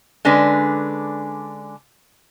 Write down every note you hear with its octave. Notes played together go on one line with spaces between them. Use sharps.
D3 G#3 C#4 D4 B4